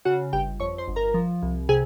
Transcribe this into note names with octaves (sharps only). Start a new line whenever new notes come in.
C#3 F#4 F#5
G1 G4 G5
F2 C#5 C#6
C5 C6
G1
A#4 A#5
F3
C2
C3 G#4 G#5